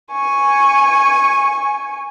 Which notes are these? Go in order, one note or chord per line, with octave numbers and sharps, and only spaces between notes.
G#5 C#6